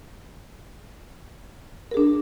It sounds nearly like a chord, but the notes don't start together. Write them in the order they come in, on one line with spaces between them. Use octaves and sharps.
A#4 G#4 D4